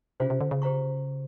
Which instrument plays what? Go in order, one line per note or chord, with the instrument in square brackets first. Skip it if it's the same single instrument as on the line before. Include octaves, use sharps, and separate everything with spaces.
[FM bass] C3 [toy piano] C#4 F4 G#4 C5 F5
[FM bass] C3
D3
C#3
[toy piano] G4 C5 F5 A#5 C#6